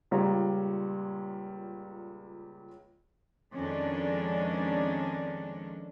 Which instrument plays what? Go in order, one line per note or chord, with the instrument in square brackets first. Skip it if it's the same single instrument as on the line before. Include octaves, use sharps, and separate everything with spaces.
[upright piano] C#2 A#2 G3 C#5 F5 A#5
[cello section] F2 D#3 G#3 C#4 D4